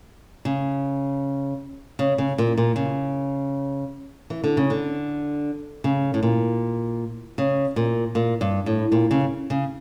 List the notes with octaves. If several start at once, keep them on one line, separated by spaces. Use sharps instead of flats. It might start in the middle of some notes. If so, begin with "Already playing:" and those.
C#3
C#3
C#3
A#2
A#2
C#3
E3
D3
C#3
D3
C#3
A2
A#2
C#3
A#2
A#2
G2
A2
A#2
C#3
C#3